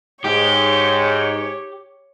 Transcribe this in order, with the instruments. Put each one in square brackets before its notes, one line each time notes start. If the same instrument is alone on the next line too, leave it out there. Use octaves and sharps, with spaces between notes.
[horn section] G#2 [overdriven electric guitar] G4 [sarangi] C#5